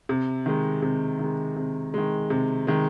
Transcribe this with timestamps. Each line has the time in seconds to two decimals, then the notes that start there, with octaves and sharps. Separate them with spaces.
0.09 C3
0.46 D#3 G#3
0.82 C3
1.19 D#3 G#3
1.56 C3
1.94 D#3 G#3
2.30 C3
2.67 D#3 G#3